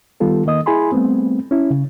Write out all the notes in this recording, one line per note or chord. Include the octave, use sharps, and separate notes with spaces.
D#3 G3 B3 F4 A4
D#3 A#3 D#5 D#6
E4 G#4 G#5 B5 C6
G3 A3 B3 C4
C#4 E4
C#3